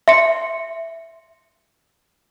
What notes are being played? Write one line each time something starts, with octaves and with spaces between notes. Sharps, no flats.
E5 C6 C#7